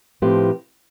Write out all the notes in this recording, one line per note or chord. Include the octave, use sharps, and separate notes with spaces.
A2 F3 C4 G4 B4